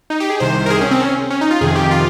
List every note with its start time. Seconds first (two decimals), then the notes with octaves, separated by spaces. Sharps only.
0.10 D#4
0.20 G4
0.30 G#4
0.40 C2 C3 D#3 C5
0.66 A#4
0.70 G#4
0.81 C#4
0.91 C4
1.00 C#4
1.30 C#4
1.41 D#4
1.51 F4
1.61 F2 C3 D#3 G#4
1.75 G4
1.91 F4